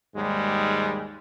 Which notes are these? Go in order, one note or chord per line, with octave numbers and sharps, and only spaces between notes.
D#2 G#2 G3 G#3